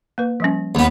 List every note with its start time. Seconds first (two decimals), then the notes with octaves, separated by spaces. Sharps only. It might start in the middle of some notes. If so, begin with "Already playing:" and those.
0.18 A#3 B4
0.40 F3 G3 C#4
0.75 D#2 B3